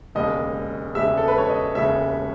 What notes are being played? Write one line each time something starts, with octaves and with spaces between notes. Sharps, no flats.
E1 D#2 C#3 G#3 D#5
E1 D#2 C#3 G#3 E5
A4
B4
C#5
D#5
E1 D#2 C#3 G#3 E5